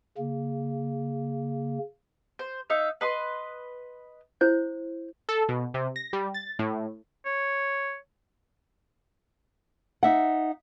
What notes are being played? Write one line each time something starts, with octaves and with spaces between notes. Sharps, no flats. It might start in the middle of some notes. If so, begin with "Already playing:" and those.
C#3 A#3
C5
D#4 E5 F5
B4 D#5 C6
E4 C5 G6
A4
B2
C3
A#6
G3
A6
A2
C#5
D#4 E5 F#5